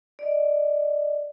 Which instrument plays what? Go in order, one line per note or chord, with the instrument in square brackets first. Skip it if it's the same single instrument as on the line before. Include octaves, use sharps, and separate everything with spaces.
[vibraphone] D5 D#5